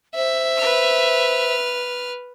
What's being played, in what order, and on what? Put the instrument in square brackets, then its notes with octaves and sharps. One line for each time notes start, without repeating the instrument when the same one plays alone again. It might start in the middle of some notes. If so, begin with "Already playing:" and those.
[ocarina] C5 [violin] E5
[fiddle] B4 F6